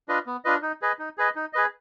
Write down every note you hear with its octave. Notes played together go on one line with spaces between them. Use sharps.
D4 F4 B4 D#5
B3
D4 F4 B4 D#5
D#4
G#4 B4 D#5
D#4
G#4 B4 D#5
D#4
G#4 B4 D#5